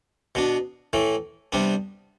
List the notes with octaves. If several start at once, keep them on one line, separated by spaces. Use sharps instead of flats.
B2 B3 D4
A2 E3 A3
C3 G3 B3 D4